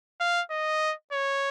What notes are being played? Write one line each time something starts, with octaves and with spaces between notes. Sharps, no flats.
F5
D#5
C#5